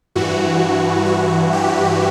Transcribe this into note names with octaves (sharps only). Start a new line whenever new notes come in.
G2 E3 F#4
F#4
G4